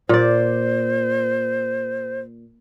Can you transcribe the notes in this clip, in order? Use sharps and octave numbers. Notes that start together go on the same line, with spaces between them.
A#2 C5 D5